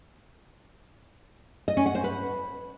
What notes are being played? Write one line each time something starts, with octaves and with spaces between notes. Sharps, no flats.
D#5
C#4
F#5
C5
B4